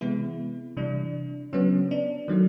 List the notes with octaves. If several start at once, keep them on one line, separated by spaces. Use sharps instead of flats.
C3 E3 G#3 B3 E4
C3 E3 G3 D4
C#3 F#3 B3 C#4
D4
D#3 F#3 A3